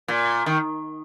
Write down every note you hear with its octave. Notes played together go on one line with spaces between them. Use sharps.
A#2
D#3